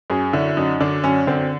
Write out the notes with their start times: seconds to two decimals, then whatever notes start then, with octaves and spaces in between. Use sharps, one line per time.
0.10 F#2 G#4
0.33 D3 E4
0.57 F#2 D#4
0.80 D3 D4
1.04 F#2 C#4
1.27 D3 C4